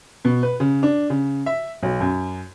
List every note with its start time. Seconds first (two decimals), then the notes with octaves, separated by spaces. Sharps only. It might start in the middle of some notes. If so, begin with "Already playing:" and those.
0.25 B2
0.43 B4
0.60 C#3
0.83 D4
1.10 C#3
1.46 E5
1.83 B1
2.00 F#2